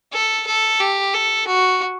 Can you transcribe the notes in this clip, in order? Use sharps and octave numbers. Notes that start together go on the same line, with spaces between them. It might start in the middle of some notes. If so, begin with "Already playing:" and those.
A4
A4
G4
A4
F#4